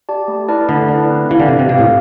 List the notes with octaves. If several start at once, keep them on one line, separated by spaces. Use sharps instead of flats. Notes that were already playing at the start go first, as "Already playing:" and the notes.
G4 D5 A5
A3
E4 B4 D5 A5
D3 A3
E4 B4 D5 A5
C4
E3 G4 B4 F5
D3
C3 C4
C3
B2 G4 B4 F5
A2